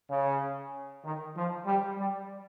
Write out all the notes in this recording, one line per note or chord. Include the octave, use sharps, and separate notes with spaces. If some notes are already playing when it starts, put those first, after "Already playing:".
C#3
D#3
F3
G3
G3